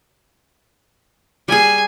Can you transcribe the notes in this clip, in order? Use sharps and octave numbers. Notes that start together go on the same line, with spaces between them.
G3 G#4 G#5